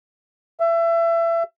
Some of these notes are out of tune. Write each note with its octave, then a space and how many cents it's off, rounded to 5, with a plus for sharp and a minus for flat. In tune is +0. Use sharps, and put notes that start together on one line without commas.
E5 +25